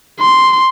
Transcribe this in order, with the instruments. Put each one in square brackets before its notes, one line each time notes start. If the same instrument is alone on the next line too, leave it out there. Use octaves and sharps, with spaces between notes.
[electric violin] C6